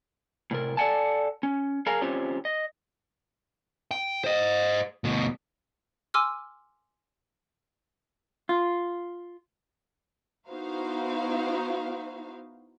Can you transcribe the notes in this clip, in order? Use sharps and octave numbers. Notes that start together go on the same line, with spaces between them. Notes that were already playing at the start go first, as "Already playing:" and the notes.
A2 C3 A#4
A4 D5 D#5 F#5 G#5 A5
C#4
G#4 A#4 F5 G#5 A#5
C4 C#4 F4 G4 C5 C#5
D#5
G5
C5 D#5
D2 B2
G#5 C6 D6 E6 F6
F4
B3 D#4 E4 F#4 C5 F5